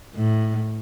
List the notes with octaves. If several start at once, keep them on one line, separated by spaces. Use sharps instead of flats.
A2